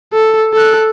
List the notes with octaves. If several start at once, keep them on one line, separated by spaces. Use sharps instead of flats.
A4
A4 F#6